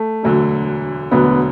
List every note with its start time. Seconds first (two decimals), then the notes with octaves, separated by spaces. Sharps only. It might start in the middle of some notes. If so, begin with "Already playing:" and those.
Already playing: A3
0.23 E1 D2 D3 F#3
1.11 E1 D2 D3 F#3 B3